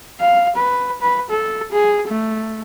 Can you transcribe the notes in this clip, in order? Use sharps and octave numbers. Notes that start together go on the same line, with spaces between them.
F5
B4
B4
A4
G#4
A3